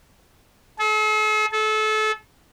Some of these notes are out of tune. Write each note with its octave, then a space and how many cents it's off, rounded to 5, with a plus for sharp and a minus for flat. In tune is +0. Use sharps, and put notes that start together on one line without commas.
A4 -45
A4 -30